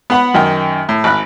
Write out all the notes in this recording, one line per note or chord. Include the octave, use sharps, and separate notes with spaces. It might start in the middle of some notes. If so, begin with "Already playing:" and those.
B3 F#5 B5
F#2 D#3 G5
A2
G#1 B5 F#6